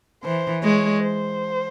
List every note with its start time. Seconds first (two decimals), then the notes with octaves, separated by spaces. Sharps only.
0.24 E3 C5
0.63 G#3 C#5
1.03 C5